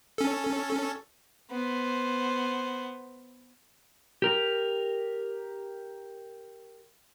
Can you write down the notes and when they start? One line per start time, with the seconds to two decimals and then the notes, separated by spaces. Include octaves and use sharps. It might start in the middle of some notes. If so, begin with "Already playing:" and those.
0.18 C#4 A4
1.51 B3 C5
4.22 G4 A#4